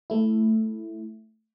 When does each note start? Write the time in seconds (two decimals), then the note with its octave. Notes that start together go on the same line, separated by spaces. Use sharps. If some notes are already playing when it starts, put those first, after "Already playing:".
0.10 A3 E4